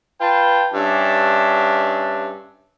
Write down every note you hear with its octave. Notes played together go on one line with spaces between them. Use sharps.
F4 B4 G5 A5
G2 C#4 D4 E5